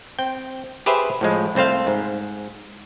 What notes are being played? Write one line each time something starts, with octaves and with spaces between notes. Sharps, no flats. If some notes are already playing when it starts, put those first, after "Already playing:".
C4 G5
G4 G#4 B4 C5 E5
A2 F3 G#3
C2 A3 C4 C5 F5
G#2